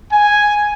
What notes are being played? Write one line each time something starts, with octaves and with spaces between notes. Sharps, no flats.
G#5